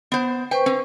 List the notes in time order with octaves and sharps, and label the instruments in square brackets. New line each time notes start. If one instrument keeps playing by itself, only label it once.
[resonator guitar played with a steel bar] B3 C5
[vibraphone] B4 C5 C#6 [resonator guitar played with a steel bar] G5
[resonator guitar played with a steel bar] C4